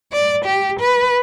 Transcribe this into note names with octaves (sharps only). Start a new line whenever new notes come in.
D5
G4
B4